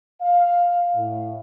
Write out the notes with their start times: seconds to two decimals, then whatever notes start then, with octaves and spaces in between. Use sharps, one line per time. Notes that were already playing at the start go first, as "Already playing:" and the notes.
0.22 F5
0.96 A2